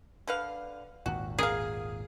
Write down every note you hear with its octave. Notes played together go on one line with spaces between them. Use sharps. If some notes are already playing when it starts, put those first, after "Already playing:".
D3 B4 F5
G#1 D#2 A#2 F#4
G#4 A#4 F5